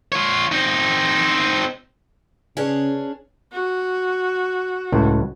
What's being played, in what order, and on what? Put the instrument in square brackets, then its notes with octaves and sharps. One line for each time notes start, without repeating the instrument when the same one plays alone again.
[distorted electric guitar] F4 C#5
C4 D#4
[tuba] C#3 [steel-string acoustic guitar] C#4 D4 G#4 [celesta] B4 D5 G#5
[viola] F#4
[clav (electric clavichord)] C#2 A2